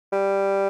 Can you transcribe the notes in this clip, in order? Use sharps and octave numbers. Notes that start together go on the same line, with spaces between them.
G3